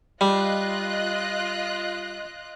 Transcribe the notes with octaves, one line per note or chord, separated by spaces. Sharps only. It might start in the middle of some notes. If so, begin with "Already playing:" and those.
G3 F4 D#5 F#6